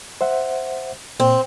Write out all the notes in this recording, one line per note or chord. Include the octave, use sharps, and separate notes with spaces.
C5 E5 F#5
A#2 C4